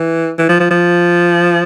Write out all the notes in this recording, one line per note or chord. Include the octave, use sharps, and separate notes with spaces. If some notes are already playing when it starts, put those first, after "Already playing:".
Already playing: E3
E3
F3
F3
F3